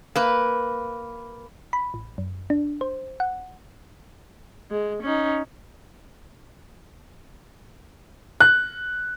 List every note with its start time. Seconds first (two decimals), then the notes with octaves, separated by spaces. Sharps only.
0.15 A#3 B4
1.73 B5
1.94 A1
2.18 F#2
2.50 D4
2.81 C5
3.20 F#5
4.71 G#3
5.03 C#4 D#4
8.40 F#6